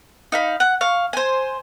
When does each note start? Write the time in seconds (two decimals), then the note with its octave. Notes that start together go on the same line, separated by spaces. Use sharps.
0.32 D#4 F5 B5
0.60 F#5
0.81 F5 C#6
1.13 C5 G#5